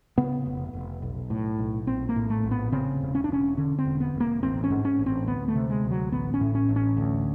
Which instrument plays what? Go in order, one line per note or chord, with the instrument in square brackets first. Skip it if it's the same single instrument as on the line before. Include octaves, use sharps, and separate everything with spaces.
[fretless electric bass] C#3 B3
F1
F1
B1
A2
B1
A#1 C4
A#3
A2
A3
A#1
B3
C#3 C4
E1
C#4
D4
E1 C#4
D3 C#4
C4
E1
B3
E1
A#3
A1 C4
C#4
G#2
C#4
A1
C4
D2 B3
A3
C3
G#3
D2
F#3
A1 B3
C#4
A2
C#4
A1
C#4
D2